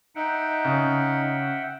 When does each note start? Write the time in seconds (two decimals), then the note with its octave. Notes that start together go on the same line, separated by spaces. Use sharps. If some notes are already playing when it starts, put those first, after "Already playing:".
0.16 D#4 E5 F#5 G5
0.65 C#3